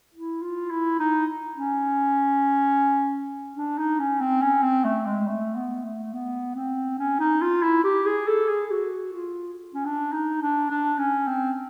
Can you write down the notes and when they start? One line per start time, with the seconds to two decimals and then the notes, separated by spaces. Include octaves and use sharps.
0.14 E4
0.42 F4
0.71 E4
0.99 D#4
1.56 C#4
3.56 D4
3.78 D#4
4.00 C#4
4.21 C4
4.42 C#4
4.63 C4
4.85 A3
5.06 G#3
5.28 A3
5.56 B3
5.85 A3
6.13 B3
6.55 C4
6.99 C#4
7.20 D#4
7.41 F4
7.63 E4
7.84 G4
8.06 G#4
8.27 A4
8.49 G#4
8.71 F#4
9.13 F4
9.74 C#4
9.85 D4
10.13 D#4
10.42 D4
10.70 D4
10.98 C#4
11.27 C4